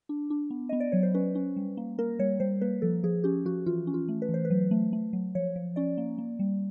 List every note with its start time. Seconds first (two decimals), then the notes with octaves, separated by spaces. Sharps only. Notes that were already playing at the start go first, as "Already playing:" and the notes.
0.09 D4
0.30 D4
0.50 B3
0.69 B3 D#5
0.80 D5
0.92 F#3 C#5
1.03 C5
1.14 C#4 B4
1.35 C#4
1.56 G3
1.77 A#3
1.99 A#3 A#4
2.19 G3 C#5
2.40 G3 C5
2.61 A#3 B4
2.82 F3 A4
3.04 F3 G#4
3.24 C#4 G4
3.45 F3 F#4
3.66 E3 F4
3.87 C#4
3.94 F4
4.08 A3
4.22 B4
4.29 E3 C5
4.45 B4
4.50 F#3
4.71 A3
4.93 A3
5.13 F#3
5.35 F3 C#5
5.56 F3
5.76 C#4 D5
5.98 A#3
6.18 A#3
6.39 G3